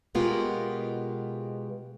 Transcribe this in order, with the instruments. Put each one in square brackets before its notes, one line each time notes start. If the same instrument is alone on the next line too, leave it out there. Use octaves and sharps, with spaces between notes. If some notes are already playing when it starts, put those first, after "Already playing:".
[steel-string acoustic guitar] B2 G#3 B3 F4 G4 A#4